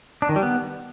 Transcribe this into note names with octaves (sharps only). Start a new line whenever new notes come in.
D4
D#3
G3
B3